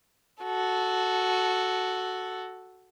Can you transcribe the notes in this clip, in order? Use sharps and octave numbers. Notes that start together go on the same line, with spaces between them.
F#4 A4